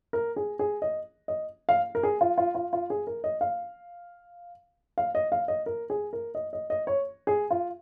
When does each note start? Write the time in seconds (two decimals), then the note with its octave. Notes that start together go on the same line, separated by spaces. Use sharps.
0.13 A#4
0.36 G#4
0.59 G#4
0.82 D#5
1.28 D#5
1.69 F5
1.95 A#4
2.03 G#4
2.21 F4
2.38 F4
2.55 F4
2.73 F4
2.90 G#4
3.07 A#4
3.24 D#5
3.41 F5
4.98 F5
5.15 D#5
5.32 F5
5.48 D#5
5.66 A#4
5.90 G#4
6.13 A#4
6.35 D#5
6.53 D#5
6.70 D#5
6.87 C#5
7.27 G#4
7.51 F4